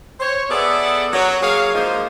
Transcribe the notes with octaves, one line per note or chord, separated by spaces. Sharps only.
C5 C#5
B3 G#4 A4 D5 E5 F#5
F#3
F#3 A#3 G#4 C#5 F5
F3 G#3 A#3 D#4 C5